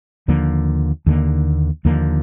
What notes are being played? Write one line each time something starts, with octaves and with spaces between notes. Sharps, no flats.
D#2 D3 F3 A#3
D#2 D3 F3 A#3
D#2 D3 F3 A#3